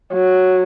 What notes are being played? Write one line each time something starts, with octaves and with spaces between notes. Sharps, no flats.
F#3